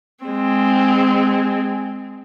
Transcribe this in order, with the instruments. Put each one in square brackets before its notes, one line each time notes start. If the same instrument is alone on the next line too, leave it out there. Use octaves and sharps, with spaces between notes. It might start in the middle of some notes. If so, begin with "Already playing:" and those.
[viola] G#3 C4